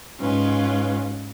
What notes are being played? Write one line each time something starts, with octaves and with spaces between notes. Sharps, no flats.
G#2 C#4 F4 B4